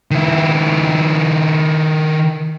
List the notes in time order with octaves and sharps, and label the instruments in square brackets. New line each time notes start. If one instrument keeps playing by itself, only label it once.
[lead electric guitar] D#3 E4